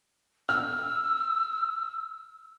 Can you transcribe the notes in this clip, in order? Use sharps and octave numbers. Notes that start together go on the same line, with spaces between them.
E6 F6